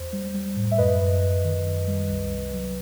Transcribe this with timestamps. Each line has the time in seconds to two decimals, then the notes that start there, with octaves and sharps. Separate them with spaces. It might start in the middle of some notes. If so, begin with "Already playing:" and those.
Already playing: E2 C5
0.13 G3
0.34 G3
0.56 A2
0.71 E5
0.78 F#2 B4 D#5
1.00 F#2
1.22 F#2
1.44 D#3
1.65 F#2
1.88 G3
2.09 C2
2.31 C2
2.53 F#3